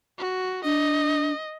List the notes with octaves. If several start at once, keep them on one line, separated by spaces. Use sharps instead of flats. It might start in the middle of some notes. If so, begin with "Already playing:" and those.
F#4
D4 D#5